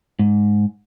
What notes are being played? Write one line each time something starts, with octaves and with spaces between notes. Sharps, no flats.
G#2